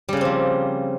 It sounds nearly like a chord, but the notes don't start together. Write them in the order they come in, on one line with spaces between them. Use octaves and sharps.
G3 C#3 A#3 C4 F3